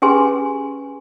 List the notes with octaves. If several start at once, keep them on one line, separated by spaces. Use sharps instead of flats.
C#4 G4 G#4 B4 G#5 C6